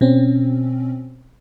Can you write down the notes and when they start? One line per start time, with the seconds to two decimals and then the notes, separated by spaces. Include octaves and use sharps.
0.01 B2 C4 C#4